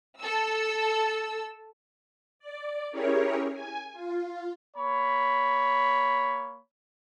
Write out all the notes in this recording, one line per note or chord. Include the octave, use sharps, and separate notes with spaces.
A4 E6
D5
C#4 E4 G4 G#4 A#4 C#5
G#5
F4
A#3 C#5 B5